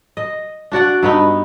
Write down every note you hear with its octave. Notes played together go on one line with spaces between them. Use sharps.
D#5
D4 F#4 D5 F#5
G2 B3 D#4